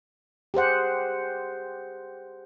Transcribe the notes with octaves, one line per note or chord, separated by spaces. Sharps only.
G4 G#4 C5 F#5